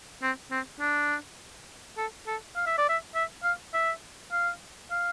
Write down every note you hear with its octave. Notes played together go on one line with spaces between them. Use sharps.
C4
C4
D4
A4
A4
F5
E5
D5
E5
E5
F5
E5
F5
F5